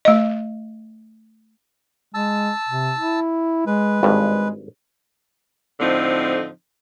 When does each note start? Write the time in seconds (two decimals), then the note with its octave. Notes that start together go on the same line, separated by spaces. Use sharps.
0.05 A3 D#5
2.14 G#3 A5 E6
2.68 C3
2.98 E4
3.67 G#3 B4
4.03 G#1 G2 G#3
5.80 A2 D3 F3 C4 D#4